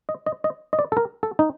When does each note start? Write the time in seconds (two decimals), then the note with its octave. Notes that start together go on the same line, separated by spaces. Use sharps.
0.09 D#5
0.26 D#5
0.44 D#5
0.73 D#5
0.79 D5
0.92 A4
0.97 A#4
1.23 A4
1.39 D#4